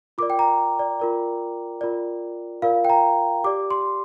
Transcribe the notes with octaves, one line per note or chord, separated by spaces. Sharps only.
F4 A#4 D5 D6
G5
A#5
D5
F4 A#4 D5
F4 A#4 D5
F4 A#4 D5 F5
G5
A#5
G4 D5 D6
C6